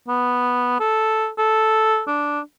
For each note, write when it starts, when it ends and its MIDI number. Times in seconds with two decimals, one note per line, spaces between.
0.08 0.79 59
0.80 1.29 69
1.38 2.02 69
2.07 2.40 62